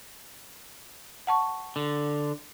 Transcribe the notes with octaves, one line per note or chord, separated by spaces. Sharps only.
F#5 A5 C#6
D3